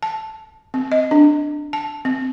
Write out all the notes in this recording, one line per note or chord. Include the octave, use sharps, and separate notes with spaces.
A5
C4
D#5
D4
A5
C4